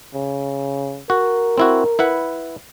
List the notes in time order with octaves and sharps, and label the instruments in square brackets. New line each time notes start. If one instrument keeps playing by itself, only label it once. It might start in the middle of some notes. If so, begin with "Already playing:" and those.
[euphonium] C#3
[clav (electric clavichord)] F#4 [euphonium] A#4
[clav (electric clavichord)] C4 E4 F#4
E4 B4 F#5